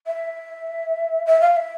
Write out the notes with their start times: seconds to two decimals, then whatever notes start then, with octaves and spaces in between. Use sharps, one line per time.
0.06 E5
1.26 E5
1.41 F5
1.56 E5